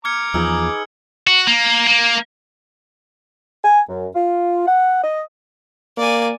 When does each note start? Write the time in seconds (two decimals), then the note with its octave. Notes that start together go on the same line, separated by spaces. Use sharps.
0.05 A#5 D6 F6 G#6 C#7
0.34 E2 F3 D#4 G#4 B4 E6
1.27 F#4
1.47 A#3
1.87 A#3
3.64 G#5
3.89 F#2
4.15 F4
4.67 F#5
5.03 D#5
5.98 A#3 D5 G#5